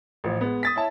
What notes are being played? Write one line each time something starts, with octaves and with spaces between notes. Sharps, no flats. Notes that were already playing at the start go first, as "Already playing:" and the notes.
A1 F3
G#3 B3
D#6 A6 B6
E4 C#5 A5